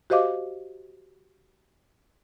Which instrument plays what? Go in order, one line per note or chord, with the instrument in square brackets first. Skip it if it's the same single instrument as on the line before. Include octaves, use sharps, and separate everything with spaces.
[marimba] F#4 G4 C5 D#5 F5 D6